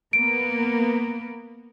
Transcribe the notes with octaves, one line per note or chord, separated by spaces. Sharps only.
A#3 B3 D7